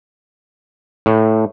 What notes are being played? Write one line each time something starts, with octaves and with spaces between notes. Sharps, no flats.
A2